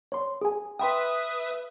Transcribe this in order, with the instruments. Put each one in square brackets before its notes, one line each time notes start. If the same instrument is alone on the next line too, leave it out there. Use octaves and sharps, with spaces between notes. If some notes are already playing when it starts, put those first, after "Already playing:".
[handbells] C#5 C6
G#4 G#5
[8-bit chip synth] B4 E5 D#6 [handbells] G5 B5 C6